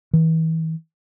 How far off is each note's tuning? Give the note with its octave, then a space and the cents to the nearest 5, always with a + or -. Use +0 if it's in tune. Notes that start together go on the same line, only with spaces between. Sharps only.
E3 -35